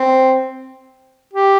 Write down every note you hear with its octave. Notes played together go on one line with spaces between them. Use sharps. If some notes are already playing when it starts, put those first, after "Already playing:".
Already playing: C4
G4